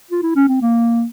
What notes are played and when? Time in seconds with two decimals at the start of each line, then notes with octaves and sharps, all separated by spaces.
0.11 F4
0.23 E4
0.36 C#4
0.48 C4
0.62 A#3